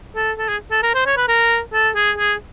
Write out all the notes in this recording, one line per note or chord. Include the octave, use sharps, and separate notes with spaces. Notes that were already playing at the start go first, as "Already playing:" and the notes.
A4
A4
G#4
A4
A#4
C5
C#5
B4
A#4
A4
G#4
G#4